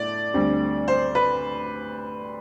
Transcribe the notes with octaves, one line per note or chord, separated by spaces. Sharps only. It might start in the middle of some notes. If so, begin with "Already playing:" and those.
Already playing: A2 A3 D5
D2 D3 G3 C4
C5
B4